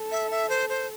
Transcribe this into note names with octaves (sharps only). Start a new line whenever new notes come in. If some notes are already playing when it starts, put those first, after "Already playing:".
Already playing: A4
E5
E5
C5
C5